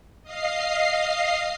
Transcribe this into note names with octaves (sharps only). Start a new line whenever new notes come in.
D#5 F5 C7